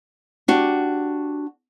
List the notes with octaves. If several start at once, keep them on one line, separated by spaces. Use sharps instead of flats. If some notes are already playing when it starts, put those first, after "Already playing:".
D4 F#4 G4